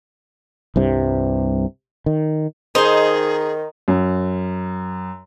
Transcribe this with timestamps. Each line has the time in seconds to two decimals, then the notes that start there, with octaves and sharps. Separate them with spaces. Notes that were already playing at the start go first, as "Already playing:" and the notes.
0.76 C2 G2 C3
2.06 D#3
2.75 D#3 D#4 G#4 C5 C6
3.88 F#2